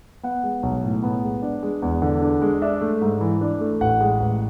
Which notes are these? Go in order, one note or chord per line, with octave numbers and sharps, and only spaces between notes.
B3 F#5
G#3
B1
A2
B3
G#3
D4
G#3
E2
D3
D4
G#3
D4 E5
A3
G#2
E3
D4
A3
A1 F#5
G#3
A1